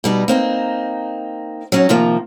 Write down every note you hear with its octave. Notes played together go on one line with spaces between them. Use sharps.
B2 G3 D#4
A#3 C4 D#4
F#3 C#4 D#4
C3 D#3 F3 A#3